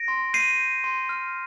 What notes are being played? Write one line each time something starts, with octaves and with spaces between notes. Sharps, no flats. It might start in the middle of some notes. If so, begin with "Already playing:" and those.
Already playing: A#6 D7
C6
G6 C7 D#7
G6
C6
F6